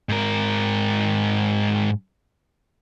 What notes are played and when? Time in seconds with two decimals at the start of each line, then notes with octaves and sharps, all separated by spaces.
0.09 G#2 A#4